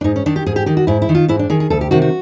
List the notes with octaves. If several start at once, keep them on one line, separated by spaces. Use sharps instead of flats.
D4
G#2 D#4
C#4
D#3 D4
G4
G#2 G#4
G4
D#3 G4
F#4
G#2 E4
E4
D#3
F4
G#2 E4
D4
D#3 G#4
G#4
D2 A4
G4
C3 D#3 F#4
F#4